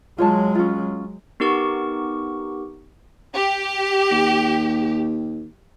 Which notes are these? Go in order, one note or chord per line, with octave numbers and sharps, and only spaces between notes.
F#3 G#3 F4 C#5 A5
C#4 F4
B3 D#4 G4 A#4 C#6
G4
D#2